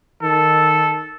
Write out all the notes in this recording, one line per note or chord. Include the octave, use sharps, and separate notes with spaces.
D#3 A4